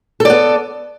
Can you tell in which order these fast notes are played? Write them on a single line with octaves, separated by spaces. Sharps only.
A4 D5 B3